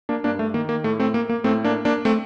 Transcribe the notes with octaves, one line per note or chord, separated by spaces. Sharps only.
A#3 D4
G2 A#3 D4
A3
D#3 A#3
A#3
A2 A3
A3 C4
A#3
A#3
A2 A3 C4
A#3 D4
A#3 D4
A3 C4